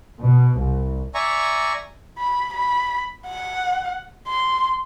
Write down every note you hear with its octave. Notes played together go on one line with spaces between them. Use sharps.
B2
C2
D5 E5 G#5 A#5 C#6
B5
B5
F#5
C6